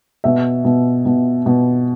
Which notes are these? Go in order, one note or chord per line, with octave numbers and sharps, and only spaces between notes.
B2 E5
B2
B2
B2